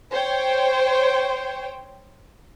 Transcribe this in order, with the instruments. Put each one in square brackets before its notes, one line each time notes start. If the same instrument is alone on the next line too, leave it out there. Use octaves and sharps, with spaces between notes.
[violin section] C5 C#5 G5